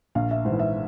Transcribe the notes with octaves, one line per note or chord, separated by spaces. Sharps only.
A#1 F5
E5
G#2 E3 C5
E5